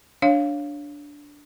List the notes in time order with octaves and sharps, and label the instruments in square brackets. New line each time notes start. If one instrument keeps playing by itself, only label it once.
[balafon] D4 C#5 F5